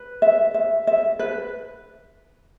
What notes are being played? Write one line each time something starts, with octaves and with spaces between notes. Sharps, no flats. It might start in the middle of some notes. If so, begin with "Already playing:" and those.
Already playing: B4
E5
E5
E5
B4